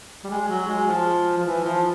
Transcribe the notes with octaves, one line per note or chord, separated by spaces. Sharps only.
G3
G#3
F#3
G#3
F3
F3
E3
F3